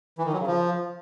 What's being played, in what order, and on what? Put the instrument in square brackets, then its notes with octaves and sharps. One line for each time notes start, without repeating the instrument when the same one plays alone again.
[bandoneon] E3
D#3
F#3
C#3
F3